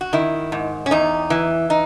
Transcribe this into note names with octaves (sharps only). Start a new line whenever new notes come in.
F#4
D#3 E4
G#2
C#4
E2 D#4
E3
D#4